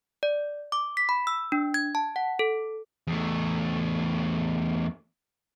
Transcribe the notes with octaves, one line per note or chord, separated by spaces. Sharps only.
D5
D6
B6
B5
E6
D4
G#6
A5
F#5
A4
E2 A3